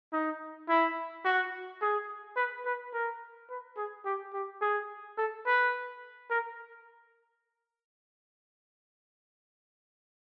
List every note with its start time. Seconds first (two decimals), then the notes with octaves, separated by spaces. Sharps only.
0.13 D#4
0.69 E4
1.25 F#4
1.81 G#4
2.36 B4
2.65 B4
2.93 A#4
3.50 B4
3.77 G#4
4.05 G4
4.33 G4
4.61 G#4
5.18 A4
5.46 B4
6.30 A#4